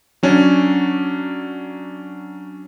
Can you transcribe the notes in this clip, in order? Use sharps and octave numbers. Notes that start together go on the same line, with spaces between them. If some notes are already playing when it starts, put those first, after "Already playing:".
F#3 C#4 D4